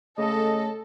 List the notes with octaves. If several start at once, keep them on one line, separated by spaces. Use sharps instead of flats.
C#3 A3 A4 D#5